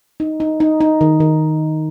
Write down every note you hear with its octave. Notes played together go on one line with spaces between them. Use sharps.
D#4
D#4
D#4
D#4
D#3
D#3